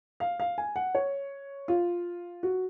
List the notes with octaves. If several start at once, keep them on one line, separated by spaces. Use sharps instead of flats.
F5
F5
G#5
F#5
C#5
F4
F#4